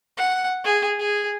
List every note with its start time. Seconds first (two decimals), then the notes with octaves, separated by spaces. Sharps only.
0.17 F#5
0.64 G#4
0.99 G#4